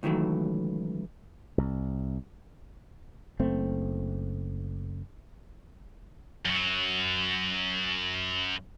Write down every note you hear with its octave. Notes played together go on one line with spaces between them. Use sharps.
C#2 D#3 E3 F#3 A3
C2
F#1 A3 C4
F#2 F#3